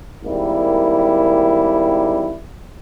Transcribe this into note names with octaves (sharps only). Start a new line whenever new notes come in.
G#1 D#3 G3 A#3 E4